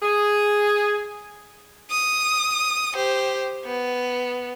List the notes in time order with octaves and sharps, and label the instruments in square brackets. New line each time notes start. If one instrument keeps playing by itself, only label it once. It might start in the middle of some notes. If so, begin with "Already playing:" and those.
[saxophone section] G#4
[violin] D#6
G4 C5
B3